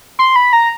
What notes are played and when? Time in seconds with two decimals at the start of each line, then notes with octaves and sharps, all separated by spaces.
0.19 C6
0.36 B5
0.53 A#5